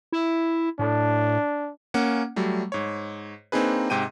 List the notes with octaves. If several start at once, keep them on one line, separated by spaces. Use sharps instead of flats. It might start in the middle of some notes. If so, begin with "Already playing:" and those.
E4
A2 D4
A#3 C#4 F#5
F#3 G3 A3
G#2 C#5
A#3 C4 D4 D#4 G#4 B4
G#2 C3 G5 D#7